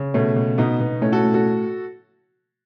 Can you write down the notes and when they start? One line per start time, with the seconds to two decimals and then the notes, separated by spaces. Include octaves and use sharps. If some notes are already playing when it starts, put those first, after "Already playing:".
Already playing: C#3
0.14 B2 A3 C#4
0.36 B2
0.58 B2 B3 D#4
0.80 B2 B3
1.01 A2 A3 C#4
1.12 F#4 A4
1.24 A2
1.34 F#4 A4